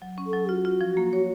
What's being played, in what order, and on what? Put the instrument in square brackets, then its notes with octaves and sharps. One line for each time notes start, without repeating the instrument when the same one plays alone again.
[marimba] F#3
C#4
[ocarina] A4
[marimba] F#3
[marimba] F4 [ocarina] F#4
[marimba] F4
F3
A#3
C#5